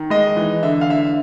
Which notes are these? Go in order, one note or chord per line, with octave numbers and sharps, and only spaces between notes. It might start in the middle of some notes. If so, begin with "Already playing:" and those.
Already playing: D#3
G#3 D#5
E3
D3 E5
F5
D3 E5